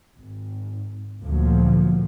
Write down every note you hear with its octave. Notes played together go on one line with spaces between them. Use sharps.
G#1
D2 A#2 F3 F#3